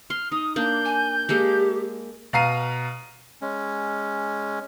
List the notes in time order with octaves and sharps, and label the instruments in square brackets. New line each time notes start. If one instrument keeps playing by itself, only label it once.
[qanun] C6 [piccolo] F6
[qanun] D#4 [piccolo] D#6
[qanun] A#3 D4 [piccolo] G6
[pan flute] G#5
[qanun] G#3 A#3 A4 [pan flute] G4
[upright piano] B2 F5 A#5 C7 D#7
[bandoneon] G#3 C#4